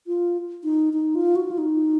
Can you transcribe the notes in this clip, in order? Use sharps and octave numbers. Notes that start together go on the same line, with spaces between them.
F4
D#4
D#4
F4
F#4
F4
D#4